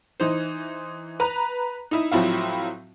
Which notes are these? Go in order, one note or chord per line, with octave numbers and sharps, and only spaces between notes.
E3 D#4 C5
B4 A#5 F#6
D#4 E4
A2 F3 F#3 C4 E4 F4